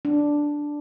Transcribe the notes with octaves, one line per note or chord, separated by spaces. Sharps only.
D4